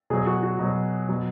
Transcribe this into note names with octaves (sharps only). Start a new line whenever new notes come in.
B2 F#3 G#4
F#4
F#4
B2 F#3
B2 F#3